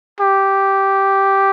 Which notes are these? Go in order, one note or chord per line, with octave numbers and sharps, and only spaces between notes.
G4